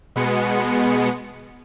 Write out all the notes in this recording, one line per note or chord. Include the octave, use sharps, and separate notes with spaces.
B2 G#3 B3 C#7